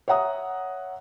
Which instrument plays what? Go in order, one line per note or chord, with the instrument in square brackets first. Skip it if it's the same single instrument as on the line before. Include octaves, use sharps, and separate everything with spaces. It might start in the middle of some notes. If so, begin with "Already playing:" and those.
[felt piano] C#5 E5 F#5 A#5 D#6